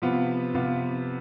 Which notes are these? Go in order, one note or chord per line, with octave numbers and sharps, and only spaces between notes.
C3 F3 B3 F4
C3 F3 B3 F4